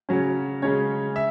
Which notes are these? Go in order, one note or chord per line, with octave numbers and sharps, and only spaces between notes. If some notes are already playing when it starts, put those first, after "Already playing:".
C#3 F#3 C#4
C#3 G#3 C#4 C#5
E5